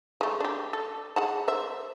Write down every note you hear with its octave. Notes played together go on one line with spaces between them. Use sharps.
G#3 A3
D4 G4
A4
G#4 F#5 A5
C5 E5